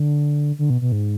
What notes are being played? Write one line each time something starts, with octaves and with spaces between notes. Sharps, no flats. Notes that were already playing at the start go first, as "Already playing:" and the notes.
Already playing: D3
D3
B2
B2
G#2